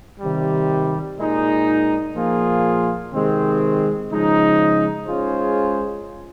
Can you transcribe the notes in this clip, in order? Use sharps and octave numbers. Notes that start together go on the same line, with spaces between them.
C3 D#3 G3
A#2 G#3 D#4
A#2 F3 A#3 F4 G#4
C3 D#3 G#3 C4
C#3 F3 G#3 D#4
G#3 C#4 F4 G#4 C5